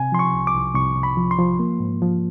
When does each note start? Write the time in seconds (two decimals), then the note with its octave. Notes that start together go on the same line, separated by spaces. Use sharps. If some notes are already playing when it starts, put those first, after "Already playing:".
Already playing: C3 G#5
0.12 F3 C6
0.19 C#6
0.33 C2
0.47 D6
0.54 C2
0.75 C2 C#6
0.96 C2
1.03 B5
1.17 F3
1.31 C6
1.38 F3
1.59 A#3
1.80 G#2
2.02 F3